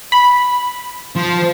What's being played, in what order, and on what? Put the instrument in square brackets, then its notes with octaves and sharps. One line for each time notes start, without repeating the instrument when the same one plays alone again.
[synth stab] B5
[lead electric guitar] F3